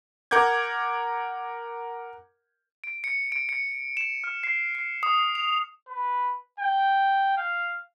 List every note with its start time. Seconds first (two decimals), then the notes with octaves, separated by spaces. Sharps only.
0.31 A#4 F#5 D6 G6 G#6
2.84 D7
3.04 C#7
3.32 D7
3.49 C#7
3.97 E7
4.24 F6
4.43 C7
4.75 C7
5.03 D#6
5.35 F7
5.88 B4
6.60 G5
7.37 F5